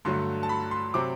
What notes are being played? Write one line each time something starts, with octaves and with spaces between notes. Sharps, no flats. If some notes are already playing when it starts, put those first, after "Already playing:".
G2 D3 F#3 A3 C6
A5
B5
C6
C3 F#3 C4 D6